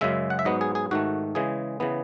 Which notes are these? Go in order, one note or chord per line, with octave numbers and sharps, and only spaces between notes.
F#2 C#3 G#3 E5
F#5
E5
G#2 F#3 B3 D#5
G#4
G#4
G#2 D#3 A3 F#4
C#3 E3 G#3 G#4
C#3 E3 B3